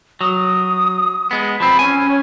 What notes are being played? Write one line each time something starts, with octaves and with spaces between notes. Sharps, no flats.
F#3 D#6
G#3 B3
F3 C4 B5
C#4 G#5